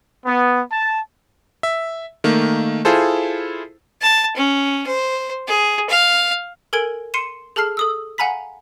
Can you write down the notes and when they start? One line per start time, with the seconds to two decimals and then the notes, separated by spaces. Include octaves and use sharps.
0.25 B3
0.72 A5
1.63 E5
2.24 D#3 A3 A#3
2.85 E4 F4 G#4 A4 C5
4.02 A5
4.36 C#4
4.86 C5
5.47 G#4
5.89 F5
6.73 A4 A#4 G#5 G#6 D7 F#7
7.14 C6 C7 C#7 D#7 E7
7.56 G#4 A4 A5 F6 C7
7.77 A4 D#6 E6
8.18 F5 F#5 G#5 A#5 B5 B6